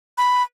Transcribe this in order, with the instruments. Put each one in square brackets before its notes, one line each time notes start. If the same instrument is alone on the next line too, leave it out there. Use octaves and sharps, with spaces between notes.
[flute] B5